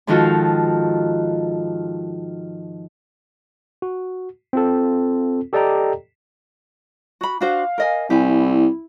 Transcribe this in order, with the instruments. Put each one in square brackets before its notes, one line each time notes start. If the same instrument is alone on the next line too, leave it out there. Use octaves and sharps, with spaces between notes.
[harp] G#2 D#3 F3 F#4 A4 F5
[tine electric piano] F#4
C4 F4 A4
G4 A4 D5 D#5 G5 A#5
[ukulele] F#4 B5
[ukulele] D4 F#4 C5 [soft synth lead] F5
[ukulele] A#4 D#5 G#5
[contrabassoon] C2 [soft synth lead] E4 [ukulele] G4 G#5